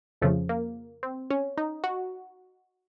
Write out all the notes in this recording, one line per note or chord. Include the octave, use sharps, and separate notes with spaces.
F2 C#3 F3 A3
A#3
C4
C#4
D#4
F#4